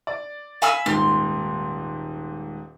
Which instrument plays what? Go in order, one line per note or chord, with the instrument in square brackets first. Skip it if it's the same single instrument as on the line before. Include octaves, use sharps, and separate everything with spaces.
[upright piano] D5
[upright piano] F5 [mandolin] G#5 B5 E6
[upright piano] D#1 G#2 [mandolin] C6